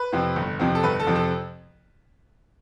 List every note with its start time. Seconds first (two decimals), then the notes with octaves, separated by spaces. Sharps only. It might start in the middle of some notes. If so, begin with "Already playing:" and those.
Already playing: B4
0.13 F2 C3 F3 C4
0.36 G1
0.59 F2 C3 F3 C4
0.75 A4
0.83 G1 B4
1.00 A4
1.07 F2 C3 F3 C4
1.15 A4